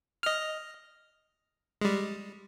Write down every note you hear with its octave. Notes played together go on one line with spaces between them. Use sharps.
D#5 F6
G3 G#3